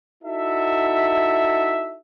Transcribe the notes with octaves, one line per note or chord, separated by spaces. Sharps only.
D#4 E4 F#4 A4 E5